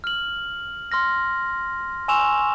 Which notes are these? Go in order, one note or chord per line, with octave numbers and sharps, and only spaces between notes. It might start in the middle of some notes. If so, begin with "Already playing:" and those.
F6 F#7
C6 F6 A#6
G#5 C6 C#6 E6 E7 F7